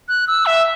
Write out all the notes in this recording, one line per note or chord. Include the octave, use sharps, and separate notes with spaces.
F#6
E6
E5